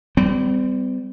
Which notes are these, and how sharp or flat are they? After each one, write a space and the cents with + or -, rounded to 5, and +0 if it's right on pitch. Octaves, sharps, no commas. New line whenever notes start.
G3 +0 C4 -45